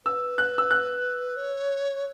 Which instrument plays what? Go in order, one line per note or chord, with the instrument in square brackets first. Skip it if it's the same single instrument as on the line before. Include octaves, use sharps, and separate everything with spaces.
[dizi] B4 [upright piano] E6
[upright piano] F#6
E6
F#6
[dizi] C#5